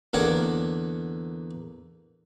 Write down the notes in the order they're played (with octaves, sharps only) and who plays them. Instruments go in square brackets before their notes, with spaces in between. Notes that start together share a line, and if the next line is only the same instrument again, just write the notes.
[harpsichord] E2 D3 A#3 C#5 F#5 D6